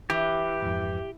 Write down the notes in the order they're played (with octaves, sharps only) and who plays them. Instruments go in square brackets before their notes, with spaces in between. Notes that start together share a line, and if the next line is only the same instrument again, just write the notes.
[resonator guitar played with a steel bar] E3 [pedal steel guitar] G4
[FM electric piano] F2 G#2